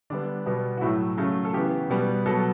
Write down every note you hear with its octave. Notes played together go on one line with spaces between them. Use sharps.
D3 G3 B3 D4
B2 G3 B3
F#4
A2 F#3 A3 E4
C#3 F#3 A3
A4
C#3 E3 B3 G4
B2 G3 B3
B2 F#3 B3 A4